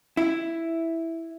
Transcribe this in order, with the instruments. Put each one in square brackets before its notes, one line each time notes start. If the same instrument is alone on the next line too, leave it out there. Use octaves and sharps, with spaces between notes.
[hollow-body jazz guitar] E4